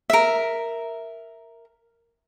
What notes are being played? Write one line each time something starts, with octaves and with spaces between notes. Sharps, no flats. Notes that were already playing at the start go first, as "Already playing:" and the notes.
A#4 E5